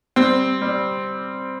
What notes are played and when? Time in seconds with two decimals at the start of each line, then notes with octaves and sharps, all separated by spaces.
0.16 G3 C4
0.62 G3